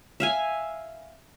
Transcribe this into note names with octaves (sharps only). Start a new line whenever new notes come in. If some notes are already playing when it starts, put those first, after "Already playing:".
E5 F5 G#5